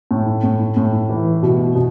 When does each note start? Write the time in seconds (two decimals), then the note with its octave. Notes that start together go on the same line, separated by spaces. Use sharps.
0.11 A2
0.44 A2
0.77 A2
1.09 E3
1.43 B2
1.75 B2